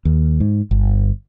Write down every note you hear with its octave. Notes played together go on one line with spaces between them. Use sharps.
D#2
G#2
G1